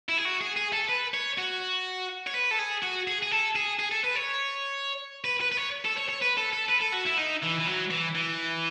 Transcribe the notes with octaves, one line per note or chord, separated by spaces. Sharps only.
E4
G#4
F#4
G#4
G#4
A4
B4
C#5
F#4
C#5
B4
A4
G#4
F#4
G#4
G#4
A4
G#4
G#4
A4
B4
C#5
B4
B4
B4
C#5
A4
C#5
C#5
B4
A4
A4
B4
A4
F#4
E4
D#4
E3
E3
F#3
E3
E3